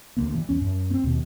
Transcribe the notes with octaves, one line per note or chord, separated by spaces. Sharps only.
D2 G3 A#3
E3 G3
E2 C#4
F#2
B3 C4
D#2 B2